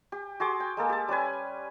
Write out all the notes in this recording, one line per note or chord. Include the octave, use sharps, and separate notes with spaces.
G4
F#4 G#4 C6 D6
G5
G#3 A#3 A4
G4 A5
G3 C#4 B4 G#5